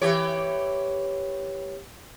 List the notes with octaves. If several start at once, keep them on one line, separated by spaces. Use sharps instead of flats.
E3 G4 C#5